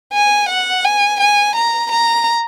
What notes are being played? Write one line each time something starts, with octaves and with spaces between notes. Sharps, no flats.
G#5
F#5
G#5
G#5
A#5
A#5